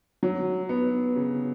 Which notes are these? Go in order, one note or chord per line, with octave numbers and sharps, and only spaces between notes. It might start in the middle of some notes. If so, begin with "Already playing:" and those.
F#3
B3
C#3